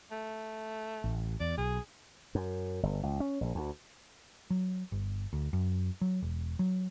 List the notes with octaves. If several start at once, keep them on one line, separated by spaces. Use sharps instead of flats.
A3
A1
E2 D5
B1 G#4
F#2
G1
C#2
C#4
A#1
D2
F#3
G1
D2
F#2
F#3
E1
F#3